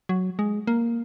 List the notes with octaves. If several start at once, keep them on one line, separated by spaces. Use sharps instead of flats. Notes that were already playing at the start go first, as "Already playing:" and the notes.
F#3
G#3
A#3